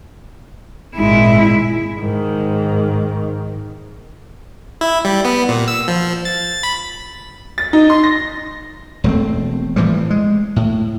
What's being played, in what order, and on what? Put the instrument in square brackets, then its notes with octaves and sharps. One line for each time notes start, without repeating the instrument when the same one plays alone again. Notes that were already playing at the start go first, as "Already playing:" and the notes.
[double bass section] G#1 A#2 [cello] G#3 E4
[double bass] G#2 D#3
[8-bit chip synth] E4
G3
B3
A#2
E6
F3
A6
B5
[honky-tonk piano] A6
D#4
C6
A#6
[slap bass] E1 G2 A3 C4
A2 E3 F3 G3
G#3
A2